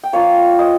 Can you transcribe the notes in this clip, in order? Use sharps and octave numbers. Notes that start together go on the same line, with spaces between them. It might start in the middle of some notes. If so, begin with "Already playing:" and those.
G5
F3 A#3 C#4 F4 C#5 F5
C5 D#5